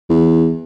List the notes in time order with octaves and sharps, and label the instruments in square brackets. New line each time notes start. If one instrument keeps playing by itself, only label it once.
[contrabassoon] E2